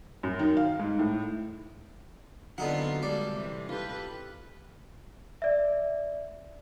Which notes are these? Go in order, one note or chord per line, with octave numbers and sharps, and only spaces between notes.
F#2
D#3
F5
G#2
A2
D3 F#3 B3 C4 D#4 F4 F#5
G3 G#3 A#3 A4 D5
C3 E3
F4 G4 A4 B4
D5 E5